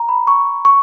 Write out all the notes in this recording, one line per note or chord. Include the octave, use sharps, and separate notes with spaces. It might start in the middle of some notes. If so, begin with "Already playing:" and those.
Already playing: A#5
B5
C#6
C#6